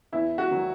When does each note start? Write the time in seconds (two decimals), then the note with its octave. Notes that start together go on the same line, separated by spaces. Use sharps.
0.12 E2 E4
0.38 F#4
0.51 D#3 F#3